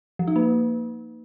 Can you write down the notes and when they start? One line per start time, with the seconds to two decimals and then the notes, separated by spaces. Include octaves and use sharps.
0.19 F3
0.28 D#4
0.36 A#3